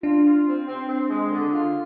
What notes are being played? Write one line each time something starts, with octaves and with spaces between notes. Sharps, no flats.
D4 F4
F4
C4
C4
C4
G#3
D3
F4